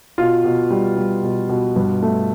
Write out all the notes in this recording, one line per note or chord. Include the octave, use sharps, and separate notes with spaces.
B2 F4
B2
G3
G3
B2
B2
G2
A3